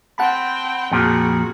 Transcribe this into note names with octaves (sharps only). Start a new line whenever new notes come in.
C4 F#5 G5 A5 B5
F2 A#2 F3 F#4 G#4